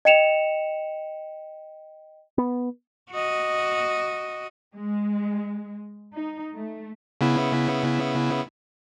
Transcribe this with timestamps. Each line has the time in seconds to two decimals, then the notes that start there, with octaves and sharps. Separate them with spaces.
0.05 D#5 G5 C#7 E7 F7
2.38 B3
3.11 F#4 D#5
4.74 G#3
6.12 D#4
6.54 A3
7.21 C#3 B3 E4